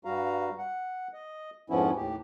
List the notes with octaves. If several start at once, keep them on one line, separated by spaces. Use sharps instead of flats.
G2 G3 F#4 F5 A#5
F#5
D#5
F2 G#2 F3 B3 C#4 E4
D#2 A2 G4